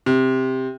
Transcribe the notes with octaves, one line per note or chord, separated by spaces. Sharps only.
C3